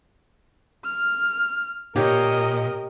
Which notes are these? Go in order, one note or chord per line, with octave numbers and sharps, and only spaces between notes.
F6
A#2 G4 A#4 C#5 D#5